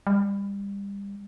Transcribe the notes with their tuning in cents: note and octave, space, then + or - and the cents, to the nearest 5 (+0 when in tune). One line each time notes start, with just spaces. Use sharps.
G3 +30